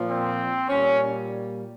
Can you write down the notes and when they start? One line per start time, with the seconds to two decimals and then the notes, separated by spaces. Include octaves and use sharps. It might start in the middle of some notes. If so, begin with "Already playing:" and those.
Already playing: A#2 F3
0.08 C4
0.68 A#2 G3 C#4